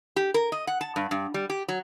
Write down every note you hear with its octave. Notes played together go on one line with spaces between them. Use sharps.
G4
A#4
D#5
F#5
A5
G2
G2
G3
G4
F#3